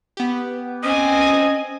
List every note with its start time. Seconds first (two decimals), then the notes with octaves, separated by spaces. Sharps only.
0.17 B3 G4
0.83 C4 C#4 D#5 G#5